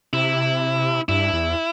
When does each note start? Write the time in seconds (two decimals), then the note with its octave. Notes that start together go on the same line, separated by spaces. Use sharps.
0.13 C3 E4
1.09 G2 E4
1.34 E2